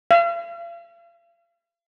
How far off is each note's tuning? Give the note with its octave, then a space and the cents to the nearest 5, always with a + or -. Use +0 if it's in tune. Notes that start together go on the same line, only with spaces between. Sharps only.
F5 -40